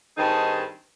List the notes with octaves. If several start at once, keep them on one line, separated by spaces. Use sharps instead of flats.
G2 D#3 C4 D#4 G#4 A5